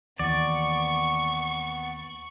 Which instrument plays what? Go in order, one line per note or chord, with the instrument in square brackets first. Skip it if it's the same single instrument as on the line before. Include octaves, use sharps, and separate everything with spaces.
[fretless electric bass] D#2 E3 [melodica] B3 [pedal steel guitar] D5 [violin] C#6